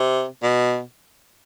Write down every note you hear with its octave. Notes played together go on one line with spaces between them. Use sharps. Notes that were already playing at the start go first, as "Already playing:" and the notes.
Already playing: C3
B2